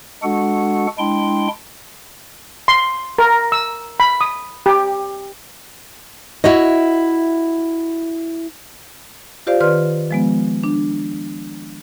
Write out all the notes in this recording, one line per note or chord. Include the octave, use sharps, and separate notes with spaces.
G#3 D4 F#4 A4 F#5
G#3 D4 E4 G5 C6
C6
A#4
E6
B5
D#6
G4
E4 F#4 C#5 D#5
F4 G4 C5 D5 F5
D#3 B4 D5 C6 F6
F3 G#3 B3
D4